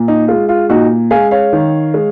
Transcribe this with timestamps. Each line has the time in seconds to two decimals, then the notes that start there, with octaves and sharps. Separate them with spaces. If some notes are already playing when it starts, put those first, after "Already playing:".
Already playing: A#2
0.08 D#4
0.28 G#3 F4
0.49 F4
0.69 A#2 D#4 F#4
1.11 G#3 F5 G#5
1.31 C#5 F5
1.53 D#3
1.94 G#3